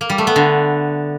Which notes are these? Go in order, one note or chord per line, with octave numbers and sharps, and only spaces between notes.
A#3
G3
A3
B3
D3